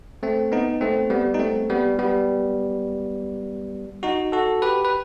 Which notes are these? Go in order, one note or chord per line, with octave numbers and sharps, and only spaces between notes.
A3 C4
B3 D#4
A3 C4
G3 B3
D#4
A3 C4
G3 B3
G3 B3
D#4 F#4
F#4 A4
G4 B4
B4